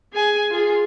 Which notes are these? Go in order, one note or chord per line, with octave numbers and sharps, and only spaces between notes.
G#4 G#5
F4 G#4